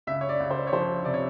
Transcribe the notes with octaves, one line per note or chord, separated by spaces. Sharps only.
C#2 E5
C#5
D5
C#2
C5
C#5
F3 C5
C3 D5
C#5